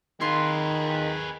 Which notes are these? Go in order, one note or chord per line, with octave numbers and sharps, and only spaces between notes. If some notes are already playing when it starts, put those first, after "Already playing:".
D#3 F4 G#4 B4 C6 E6